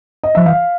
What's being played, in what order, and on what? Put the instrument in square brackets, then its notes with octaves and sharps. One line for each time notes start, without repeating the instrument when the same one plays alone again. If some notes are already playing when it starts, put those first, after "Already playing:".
[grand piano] D#5
[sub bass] F3 [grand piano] E5
[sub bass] E3 [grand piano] F5